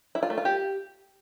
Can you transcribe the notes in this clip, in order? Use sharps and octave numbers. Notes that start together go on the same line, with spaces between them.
E4
F4
A3
F4
G4